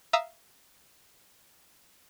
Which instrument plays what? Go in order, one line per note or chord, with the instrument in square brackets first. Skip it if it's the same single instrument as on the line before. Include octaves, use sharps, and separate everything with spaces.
[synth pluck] E5 F5 A#5 D#6 E6